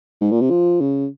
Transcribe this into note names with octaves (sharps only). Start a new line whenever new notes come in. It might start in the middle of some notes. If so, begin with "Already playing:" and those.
G#2
A#2
C3
F3
C#3